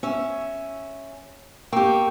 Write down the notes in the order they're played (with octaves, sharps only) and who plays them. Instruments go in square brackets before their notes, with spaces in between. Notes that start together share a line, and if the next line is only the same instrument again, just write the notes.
[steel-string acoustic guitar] C#4 E5
[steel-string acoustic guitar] A#3 G4 [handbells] G5 C#6 E6